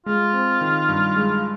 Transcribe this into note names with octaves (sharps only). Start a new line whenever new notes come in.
G#3 F4
C4
D#3
G2
G#3